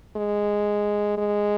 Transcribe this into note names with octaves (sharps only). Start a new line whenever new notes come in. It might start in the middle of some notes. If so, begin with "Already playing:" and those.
G#3
G#3